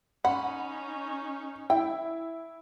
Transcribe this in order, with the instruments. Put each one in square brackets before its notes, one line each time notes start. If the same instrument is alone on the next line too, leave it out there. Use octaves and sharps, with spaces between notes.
[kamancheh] C#4 D#4 [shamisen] F#5 [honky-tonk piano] B5
[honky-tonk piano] E4 [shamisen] G5